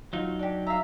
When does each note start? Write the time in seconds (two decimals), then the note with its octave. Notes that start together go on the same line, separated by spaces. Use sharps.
0.13 F#3 D#4 F4
0.39 D4 G4
0.67 E5 F5 A#5